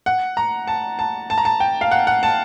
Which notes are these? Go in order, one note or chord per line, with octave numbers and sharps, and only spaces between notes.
F#5
A#5
A5
A5
A5
A#5
A5
G5
F5
F#5
F#5
A5